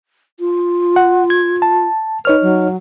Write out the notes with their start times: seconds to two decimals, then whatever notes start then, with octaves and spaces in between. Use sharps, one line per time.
0.40 F4
0.96 F#5
1.30 G#6
1.62 A5
2.25 D#4 B4 C#5 F6
2.42 F#3